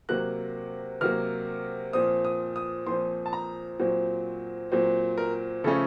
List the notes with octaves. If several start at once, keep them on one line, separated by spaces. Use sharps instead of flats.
C3 F#3 A#3 F#6
C3 F#3 A#3 F6
A#2 F3 C4 D#6
D#6
D#6
A#2 F3 C4 C6
A5
A#5
A#2 F#3 C4
A#2 F#3 C4
A#4
C#3 F3 A3 C#4 A4